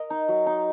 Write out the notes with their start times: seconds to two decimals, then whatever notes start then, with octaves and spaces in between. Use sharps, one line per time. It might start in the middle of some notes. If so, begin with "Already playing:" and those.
Already playing: A#4 D#5
0.10 D#4
0.28 F#3
0.47 D#4